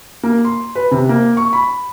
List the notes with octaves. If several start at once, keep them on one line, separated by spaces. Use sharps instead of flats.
A#3
C6
B4
C3
A#3
C#6
B5